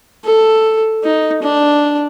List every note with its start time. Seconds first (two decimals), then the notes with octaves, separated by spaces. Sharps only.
0.24 A4
1.03 D#4
1.42 D4